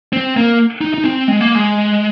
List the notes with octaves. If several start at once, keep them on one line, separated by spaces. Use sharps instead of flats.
C4
A#3
D#4
D#4
C4
G#3
A#3
G#3